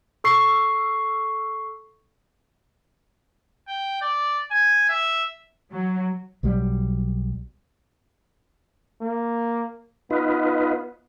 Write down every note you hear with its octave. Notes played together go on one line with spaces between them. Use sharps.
A4 C#6 C7
G5
D5
G#5
E5
F#3
B1 F#3 G3
A#3
B3 D#4 F4 B4